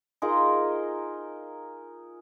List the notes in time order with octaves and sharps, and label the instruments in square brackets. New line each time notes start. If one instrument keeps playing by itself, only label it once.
[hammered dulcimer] D#4 F4 G#4 A#4